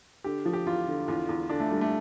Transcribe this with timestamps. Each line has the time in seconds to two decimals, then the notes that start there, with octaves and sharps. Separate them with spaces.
0.24 D3 G4
0.45 F3
0.53 G4
0.67 E2 F4
0.88 D3
1.08 E2 F4
1.29 E2
1.50 D3 D4
1.60 A3
1.71 D3 G3
1.81 A3